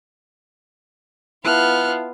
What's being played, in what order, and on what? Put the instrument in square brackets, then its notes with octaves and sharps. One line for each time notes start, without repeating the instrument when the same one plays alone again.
[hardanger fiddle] B3 F4 [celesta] E4 E5 A5 [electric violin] F6 F#6